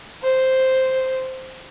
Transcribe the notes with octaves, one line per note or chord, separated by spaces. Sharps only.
C5